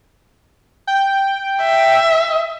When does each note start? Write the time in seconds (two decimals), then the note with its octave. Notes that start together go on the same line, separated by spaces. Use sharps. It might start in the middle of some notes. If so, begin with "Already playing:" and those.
0.87 G5
1.61 E5